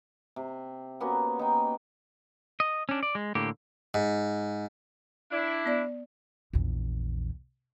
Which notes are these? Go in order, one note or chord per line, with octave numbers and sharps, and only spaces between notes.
C3
A#3 B3 C#4 F#4
D#4 G5
D#5
C#4 D4
D5
G#3
A2 D3 A#3 G4
G#2
D4 E4
B3 D5
A#1 E2